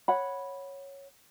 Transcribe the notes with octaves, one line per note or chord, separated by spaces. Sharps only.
C#5 F#5 B5